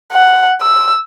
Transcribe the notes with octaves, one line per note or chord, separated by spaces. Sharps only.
F#5
E6